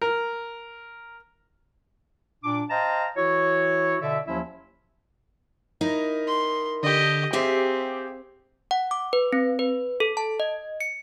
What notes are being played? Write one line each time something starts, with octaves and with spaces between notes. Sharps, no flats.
A#4
A#2 D4 D6
C5 D#5 F5 G5 A5 A#5
E3 E4 F#4 C#5
B2 D3 D5 E5
D#2 F3 F#3 C#4 E4 E5
D#4 E4 A#4
C6
D3 G4 D#5
C4 G4 G#4 E5 F5
F#5
D6
B4
C4
B4
A4
A5
D#5
C#7